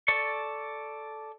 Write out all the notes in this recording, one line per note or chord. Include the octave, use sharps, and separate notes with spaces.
A4 D5 C#6